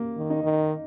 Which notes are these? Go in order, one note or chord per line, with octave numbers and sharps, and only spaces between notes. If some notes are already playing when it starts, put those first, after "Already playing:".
Already playing: A#3
D#3
D#4
D#3